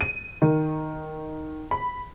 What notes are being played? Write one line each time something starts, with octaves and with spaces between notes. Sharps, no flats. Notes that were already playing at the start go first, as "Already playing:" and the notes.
D#7
D#3
B5